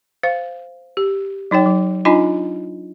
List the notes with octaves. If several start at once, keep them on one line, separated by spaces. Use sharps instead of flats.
C5 F5
G4
F#3 D#4 C#5 G5
F#3
D4 D#4 F4 D#5 G#5 B5